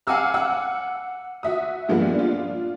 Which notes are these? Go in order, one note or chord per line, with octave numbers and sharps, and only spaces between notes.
F5 F#5 G#5 D6 E6 F6
F#5 E6
F#4 E5 D#6
G2 A#2 F3 G#3 A#3 B3
D4 F4